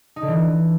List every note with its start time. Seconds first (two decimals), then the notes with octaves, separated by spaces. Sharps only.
0.16 D#4
0.22 D3
0.28 E3